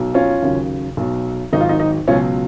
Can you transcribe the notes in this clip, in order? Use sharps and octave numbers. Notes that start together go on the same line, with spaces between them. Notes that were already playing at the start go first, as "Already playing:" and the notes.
Already playing: B1 B2 F#3
C#4 F4
D#2 C#3 F#3
B1 B2 F#3
G#1 G#2 D#3 F#3 D#4
F4
D#4
D#4
C#2 B2 F#3 C#4 F4